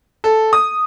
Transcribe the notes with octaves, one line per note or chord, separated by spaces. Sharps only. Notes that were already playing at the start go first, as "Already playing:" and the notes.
A4
D#6